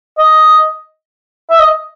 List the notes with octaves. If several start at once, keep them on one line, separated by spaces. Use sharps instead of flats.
D#5
E5
D#5